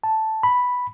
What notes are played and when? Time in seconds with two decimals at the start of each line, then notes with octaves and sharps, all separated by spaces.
0.04 A5
0.43 B5